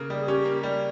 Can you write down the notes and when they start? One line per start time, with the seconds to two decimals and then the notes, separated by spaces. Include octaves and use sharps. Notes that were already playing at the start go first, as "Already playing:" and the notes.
Already playing: C#3 A#3
0.10 G3 G#4
0.22 G#4
0.27 C#4 G4
0.45 A#3
0.63 G3